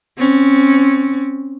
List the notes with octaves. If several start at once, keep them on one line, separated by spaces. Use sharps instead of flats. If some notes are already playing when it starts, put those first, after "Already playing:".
C4 C#4